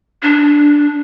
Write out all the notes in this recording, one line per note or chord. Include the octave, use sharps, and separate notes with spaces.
D4